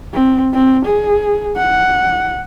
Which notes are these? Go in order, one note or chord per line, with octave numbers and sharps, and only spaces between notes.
C4
C4
G#4
F#5